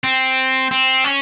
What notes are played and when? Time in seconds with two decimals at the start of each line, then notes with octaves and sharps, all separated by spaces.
0.04 C4
0.71 C4
1.04 C#4